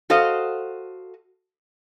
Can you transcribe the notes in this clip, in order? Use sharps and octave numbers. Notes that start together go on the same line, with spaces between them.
F#4 A4 C5 D#5 F5